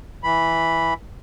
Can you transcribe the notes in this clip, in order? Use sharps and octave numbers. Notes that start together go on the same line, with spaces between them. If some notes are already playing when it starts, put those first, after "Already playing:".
E3 B5